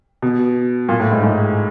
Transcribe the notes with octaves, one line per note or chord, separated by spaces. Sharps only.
B2
A#2
A2
G#2
G#2